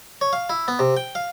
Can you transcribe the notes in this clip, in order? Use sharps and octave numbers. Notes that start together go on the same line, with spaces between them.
C#5
F5
E4
B3
C3
G5
F5